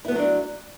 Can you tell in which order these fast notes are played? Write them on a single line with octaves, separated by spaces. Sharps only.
E4 B3 A3 F#3 D4